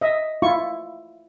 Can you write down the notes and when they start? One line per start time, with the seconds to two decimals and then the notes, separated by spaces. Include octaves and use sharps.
0.01 D#5 E5
0.42 E4 F4 C#6